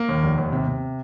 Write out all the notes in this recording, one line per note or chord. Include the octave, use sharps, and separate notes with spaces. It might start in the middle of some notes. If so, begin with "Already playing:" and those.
Already playing: A#3
D#2
F1
D#2
C3
C3